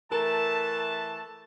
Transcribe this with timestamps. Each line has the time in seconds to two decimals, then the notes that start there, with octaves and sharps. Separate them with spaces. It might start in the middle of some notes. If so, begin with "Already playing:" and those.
0.12 E3 A3 A#4 A5